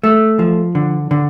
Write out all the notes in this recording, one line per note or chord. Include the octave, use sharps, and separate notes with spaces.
A3
F3
D3
D3